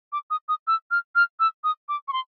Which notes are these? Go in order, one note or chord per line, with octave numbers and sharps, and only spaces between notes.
D6
D#6
D#6
E6
F6
F6
E6
D#6
D6
C#6
C6